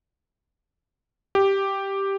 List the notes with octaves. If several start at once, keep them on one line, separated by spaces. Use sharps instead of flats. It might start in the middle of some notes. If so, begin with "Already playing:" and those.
G4